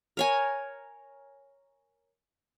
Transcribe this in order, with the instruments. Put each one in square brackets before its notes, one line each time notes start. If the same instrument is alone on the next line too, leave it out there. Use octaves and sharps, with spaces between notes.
[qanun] A#4 C#5 G#5